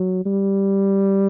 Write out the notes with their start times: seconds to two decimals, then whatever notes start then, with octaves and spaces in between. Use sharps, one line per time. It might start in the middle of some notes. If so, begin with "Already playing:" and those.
Already playing: F#3
0.25 G3